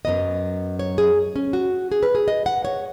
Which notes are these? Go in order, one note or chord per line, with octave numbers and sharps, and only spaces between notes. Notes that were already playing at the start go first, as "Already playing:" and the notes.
F#2 D#3 F#3 B3 D#5
C#5
G#4
C#4
F#4
G#4
B4
G#4
D#5
F#5
C#5